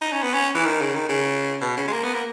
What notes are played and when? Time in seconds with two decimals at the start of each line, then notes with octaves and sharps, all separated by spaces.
0.01 D#4
0.12 C#4
0.23 B3
0.34 C#4
0.55 E3
0.65 D#3
0.82 C#3
0.95 D#3
1.09 C#3
1.61 B2
1.77 C#3
1.87 G#3
1.93 A#3
2.04 B3
2.14 A#3